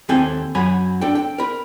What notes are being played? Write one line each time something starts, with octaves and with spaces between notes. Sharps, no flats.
D#2 C4 A4 G5 G#5
F#2 F#3 G#5 B5
D4 A4 G5
G5
A#4 B5